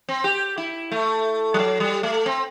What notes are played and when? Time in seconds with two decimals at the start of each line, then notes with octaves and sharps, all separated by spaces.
0.09 C4
0.24 G4
0.58 E4
0.91 A3
1.54 G3
1.59 F#3
1.80 G3
2.03 A3
2.26 C4